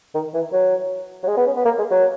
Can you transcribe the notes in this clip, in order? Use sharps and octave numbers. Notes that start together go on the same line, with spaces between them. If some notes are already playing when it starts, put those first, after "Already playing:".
D#3
E3
F#3
F#3
G#3
B3
C#4
B3
A#3
G#3
F#3